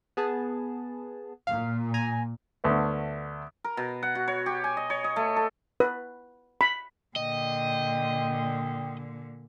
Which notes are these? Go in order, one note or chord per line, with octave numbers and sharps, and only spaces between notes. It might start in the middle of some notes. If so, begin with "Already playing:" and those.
B3 G#4 A5
A#2 F5
G#5 A#5
D2 A3 B3
A#4
B2
F#5
F#4
C#5
G4
G#5
D#5
C#5
D#5
A3
A4
B4
B5
A#2 D3 D#5 G5